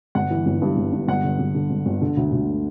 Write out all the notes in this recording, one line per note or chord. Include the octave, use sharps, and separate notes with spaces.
G1 F#5
E3
G1
G2
G1
G2
G1 F#5
D3
G1
D3
G1
G1
D3
D2
D2